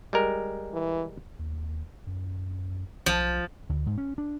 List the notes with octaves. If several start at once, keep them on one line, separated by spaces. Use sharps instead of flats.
G3 G#3 A#4
E3
D#2
F#2
B1 F3
D2
G#2
C#4
D4